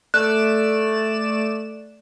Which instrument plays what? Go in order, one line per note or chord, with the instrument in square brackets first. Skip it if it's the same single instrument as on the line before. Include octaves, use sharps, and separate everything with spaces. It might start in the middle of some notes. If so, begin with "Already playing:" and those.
[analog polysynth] A3 D5 E7 [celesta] F#6